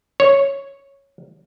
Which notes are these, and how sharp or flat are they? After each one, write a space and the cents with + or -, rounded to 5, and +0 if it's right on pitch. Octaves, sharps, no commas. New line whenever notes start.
C#5 -5